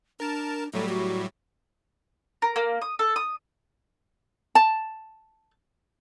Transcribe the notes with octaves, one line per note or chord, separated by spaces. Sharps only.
D4 A#4 A5
A2 F#3 G3 A4
F#4
A#4
A#3
D#6
A4
D#6
A5